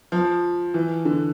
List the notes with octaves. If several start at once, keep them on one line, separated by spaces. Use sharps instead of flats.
F3
E3
D3